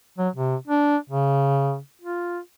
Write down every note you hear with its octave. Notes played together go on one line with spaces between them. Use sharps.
F#3
C3
D4
C#3
F4